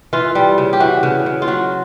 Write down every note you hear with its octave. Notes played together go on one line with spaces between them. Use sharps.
E3 F4
G3
C#3
G4
E3 F#4
C#3
C#3
F4
F#3 F#4